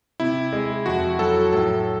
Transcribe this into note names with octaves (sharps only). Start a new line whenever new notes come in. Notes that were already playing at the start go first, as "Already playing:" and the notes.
C3 E4
G#3
F2 F#4
F#3 A4
A2 A4